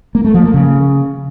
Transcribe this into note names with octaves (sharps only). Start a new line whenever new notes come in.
A#3
A3
F3
A#3
C#3